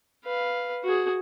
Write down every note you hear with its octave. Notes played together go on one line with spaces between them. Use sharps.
B4 F5
F#4 G#4